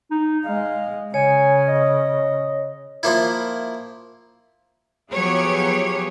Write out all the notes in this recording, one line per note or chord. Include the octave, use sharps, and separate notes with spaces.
D#4
G#3 F5
C#3 C#5 G#5
D#5
F3 A#3 E4
F3 F#3 B3 G4 G#4 C#5